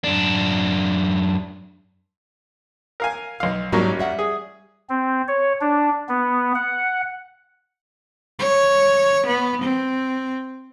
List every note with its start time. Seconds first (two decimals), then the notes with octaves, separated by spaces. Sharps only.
0.04 F#2 D4
3.00 A#4 F5 G#5
3.40 B1 F5
3.72 A#1 G#2 F#3 G3 A#3 C#4
3.99 G3 E5 F#5
4.19 G#4
4.89 C4
5.28 C#5
5.61 D4
6.09 B3
6.55 F#5
8.40 C#5
9.26 B3
9.62 C4